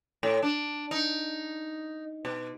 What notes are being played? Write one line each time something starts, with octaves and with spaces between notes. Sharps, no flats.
A2
D4
D#4
B2